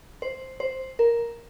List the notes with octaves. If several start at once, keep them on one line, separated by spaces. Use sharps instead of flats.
C5
C5
A#4